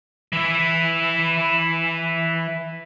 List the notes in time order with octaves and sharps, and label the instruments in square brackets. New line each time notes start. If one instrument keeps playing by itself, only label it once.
[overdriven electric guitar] E3 E4